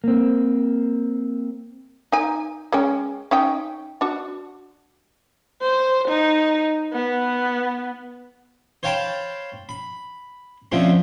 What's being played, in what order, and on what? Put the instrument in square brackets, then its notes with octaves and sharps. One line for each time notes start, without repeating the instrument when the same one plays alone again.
[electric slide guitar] A#3 C4
[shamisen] D#4 G#5
G#3 C#4 G5
C#4 D#4 G5
D4 F#4
[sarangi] C5
D#4
B3
[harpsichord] C5 C#5 F5 G5 A5 B5
B5
D3 F3 A3 C4 C#4